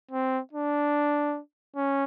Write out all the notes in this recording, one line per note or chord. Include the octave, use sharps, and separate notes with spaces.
C4
D4
C#4